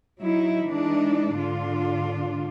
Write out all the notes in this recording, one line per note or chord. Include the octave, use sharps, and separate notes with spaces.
F#3 D#4 E4
E3 G#3 D4 D#4
G#2 D3 D4 F4